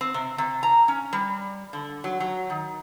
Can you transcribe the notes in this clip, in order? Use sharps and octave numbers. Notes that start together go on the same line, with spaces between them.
C4
C3
C3
A#5
C#4
G3
D3
F#3
F#3
D#3